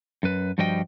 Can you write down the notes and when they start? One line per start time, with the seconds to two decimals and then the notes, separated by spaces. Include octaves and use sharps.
0.23 F#2 B4
0.58 G2 F3 G3 F#4 D#5 G5